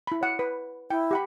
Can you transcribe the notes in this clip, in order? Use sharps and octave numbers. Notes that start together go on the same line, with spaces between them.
E4 B5
C#5 F#5
B4
E4 G5
G4 F#5 B5